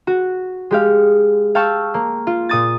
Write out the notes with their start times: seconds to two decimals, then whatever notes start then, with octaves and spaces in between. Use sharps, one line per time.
0.07 F#4
0.71 G#3 G4 F5
1.55 F5 G5 A5 C#6 E6
1.94 A#3
2.27 F4
2.49 A#2 D#6 A6